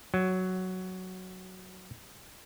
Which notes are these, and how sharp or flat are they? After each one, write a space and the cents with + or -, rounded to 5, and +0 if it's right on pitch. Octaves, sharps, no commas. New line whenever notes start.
F#3 +5